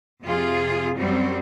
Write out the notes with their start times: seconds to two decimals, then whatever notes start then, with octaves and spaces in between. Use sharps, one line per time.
0.23 F2 C3 F4 G#4
0.96 F#2 F#3 G3 C4